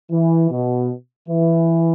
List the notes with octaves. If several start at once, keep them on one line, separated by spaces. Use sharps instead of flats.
E3
B2
E3